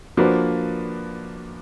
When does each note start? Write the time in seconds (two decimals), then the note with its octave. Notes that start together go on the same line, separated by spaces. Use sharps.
0.17 F3 A#3 D4 F#4 B4